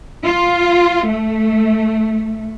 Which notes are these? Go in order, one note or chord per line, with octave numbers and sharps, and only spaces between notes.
F4
A3